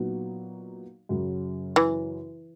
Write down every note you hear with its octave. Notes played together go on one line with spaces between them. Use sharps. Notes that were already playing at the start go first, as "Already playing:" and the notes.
Already playing: A#2 F#3 B3 D#4 F#4
F#2 C#3 F#3
E3